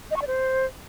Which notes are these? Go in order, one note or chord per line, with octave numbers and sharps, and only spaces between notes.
D#5
C#6
D5
C5